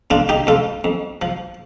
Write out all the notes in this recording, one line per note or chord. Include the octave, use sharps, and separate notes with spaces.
F2 D4 F4
D#4 G4
F2 F4 A4
F2
F3